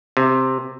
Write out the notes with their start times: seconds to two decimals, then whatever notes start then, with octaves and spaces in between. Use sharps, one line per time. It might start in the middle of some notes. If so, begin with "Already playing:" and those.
0.17 C3